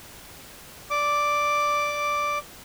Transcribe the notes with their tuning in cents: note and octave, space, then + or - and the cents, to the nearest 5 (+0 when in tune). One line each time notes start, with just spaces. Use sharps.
D5 +0 D6 +0